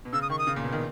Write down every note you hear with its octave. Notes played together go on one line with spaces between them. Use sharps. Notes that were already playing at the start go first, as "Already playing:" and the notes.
B2
C#3 E6
D#6
D#3 C#6
D#6
C#3
A#2
B2
D#3